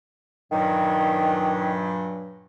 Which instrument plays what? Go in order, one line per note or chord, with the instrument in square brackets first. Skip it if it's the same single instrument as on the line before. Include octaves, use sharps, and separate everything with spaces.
[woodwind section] G2 A#2 F#3 [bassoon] D#3